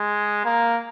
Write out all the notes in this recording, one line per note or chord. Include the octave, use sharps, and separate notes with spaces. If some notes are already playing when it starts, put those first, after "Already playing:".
Already playing: G#3
A#3